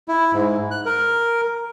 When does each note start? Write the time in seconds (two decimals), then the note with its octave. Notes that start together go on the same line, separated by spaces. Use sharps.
0.08 E4
0.33 G#2
0.71 F#6
0.85 A#4